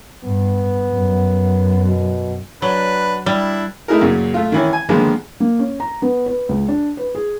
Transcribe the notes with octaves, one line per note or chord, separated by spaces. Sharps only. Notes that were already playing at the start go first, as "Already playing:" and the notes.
G2 B3
F#2
B2
F#3 D4 B4
G3 D4 E4
A3 D#4 E4 G#4 A#4
F#2 A#2 C#3
A3 F4
D#3 E3 C#4
G#5
D3 D#3 F3 G#3 A#3 B3
A#3
C#4
A#5
B3
B4
C#2
D4
B4
G#4